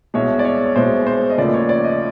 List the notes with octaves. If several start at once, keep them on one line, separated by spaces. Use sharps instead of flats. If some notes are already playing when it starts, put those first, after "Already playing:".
C2 B2 G#3 C#5
D5
C#5
C#5
C2 B2 G#3 C5
C5
D#5
D#2 C#3 F3 A3 D5
C#5
D5
D#5